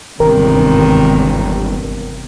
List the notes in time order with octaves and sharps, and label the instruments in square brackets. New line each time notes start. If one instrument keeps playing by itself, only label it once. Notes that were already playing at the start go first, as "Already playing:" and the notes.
[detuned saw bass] G1 [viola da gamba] E2 G#2 C3 [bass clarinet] D#3 [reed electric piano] A#4